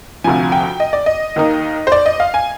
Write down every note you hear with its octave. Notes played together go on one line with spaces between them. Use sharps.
D2 C3 F3 G#5
G5
D#5
D5
D#5
D#2 D#3 A#3 D#4
C5
D5
D#5
F5
G#5